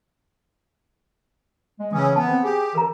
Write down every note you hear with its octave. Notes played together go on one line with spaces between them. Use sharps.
G#3
C#3 E3 C#4 D#6 E6
B3 A5
C4 C5
G4 G#4
E3 A#4 A#5